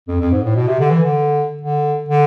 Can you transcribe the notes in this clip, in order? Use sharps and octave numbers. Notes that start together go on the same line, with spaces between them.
F2
F2
G#2
A2
B2
C3
D3
E3
D3
D3
D3